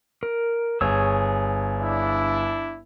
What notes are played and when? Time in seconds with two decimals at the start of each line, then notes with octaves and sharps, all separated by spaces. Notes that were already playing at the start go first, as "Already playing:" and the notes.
0.23 A#4
0.81 G1 G#4 C#5 E6
1.77 D4 E4